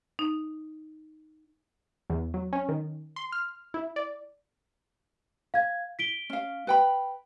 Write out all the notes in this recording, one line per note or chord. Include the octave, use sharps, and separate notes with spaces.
D#4
E2
F#3
C#4
D#3
C6
F6
E4
D5
F5 G#6
B6 D7 G7
C#4 F5
B4 G5 B5